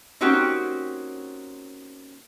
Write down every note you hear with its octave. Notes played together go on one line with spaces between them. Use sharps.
A#3 C4 C#4 D#4 F#4 G4